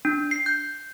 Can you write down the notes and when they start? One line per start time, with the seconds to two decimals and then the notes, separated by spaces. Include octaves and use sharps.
0.05 D4
0.31 C7
0.46 G6